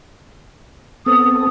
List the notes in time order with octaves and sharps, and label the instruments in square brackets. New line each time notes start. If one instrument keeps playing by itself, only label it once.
[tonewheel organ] B3 C4 A4 [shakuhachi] D#6